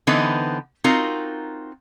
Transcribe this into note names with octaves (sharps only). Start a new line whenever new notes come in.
D3 E3 B3 C4 D#4 B4
C4 D#4 F4 F#4 A#4